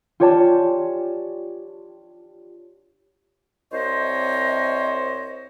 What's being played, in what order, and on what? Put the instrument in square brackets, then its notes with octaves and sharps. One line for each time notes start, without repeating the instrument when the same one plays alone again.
[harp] F4 G4 C#5 D5 G#5 A5
[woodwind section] C2 C3 C5 C#5 D#5